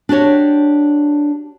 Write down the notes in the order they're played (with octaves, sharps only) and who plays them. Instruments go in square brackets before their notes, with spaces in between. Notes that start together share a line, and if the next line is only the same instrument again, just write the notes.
[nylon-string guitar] D4 F#4 G4 C#5